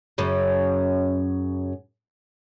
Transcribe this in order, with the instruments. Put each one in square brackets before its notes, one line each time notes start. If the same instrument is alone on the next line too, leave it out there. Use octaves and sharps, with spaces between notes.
[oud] F#2 C#3